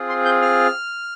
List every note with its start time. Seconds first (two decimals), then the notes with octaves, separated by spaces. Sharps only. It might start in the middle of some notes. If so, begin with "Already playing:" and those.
Already playing: C4 F4 G#4
0.09 C6
0.25 G6
0.42 F6